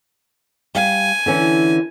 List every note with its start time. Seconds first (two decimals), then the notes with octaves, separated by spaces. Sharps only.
0.75 G3 F5 G#5
1.26 D3 E3 C#4